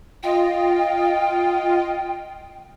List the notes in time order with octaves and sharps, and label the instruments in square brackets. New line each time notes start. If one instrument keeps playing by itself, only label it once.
[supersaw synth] F4 D#5 [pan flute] G5